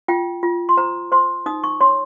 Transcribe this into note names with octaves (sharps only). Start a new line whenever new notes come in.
F4 G5
F4
C6
C5 A#5
C5 C6
D#4 D#6
C#6
C#5 C6